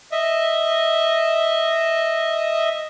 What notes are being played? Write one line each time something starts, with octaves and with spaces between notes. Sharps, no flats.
D#5 E5